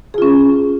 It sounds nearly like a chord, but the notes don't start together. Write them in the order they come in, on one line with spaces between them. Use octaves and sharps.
G#4 F4 C#4